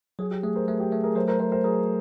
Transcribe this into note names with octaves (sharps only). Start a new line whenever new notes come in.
F#3 G#4
G4
A3 G#4
A#4 C5
A3 G#4
G4
A3 G#4
G#4 A#4
F#3 A#4 C5
A#4 C5
A3 A#4 C5
A#4 C5
F#3 G#4 A#4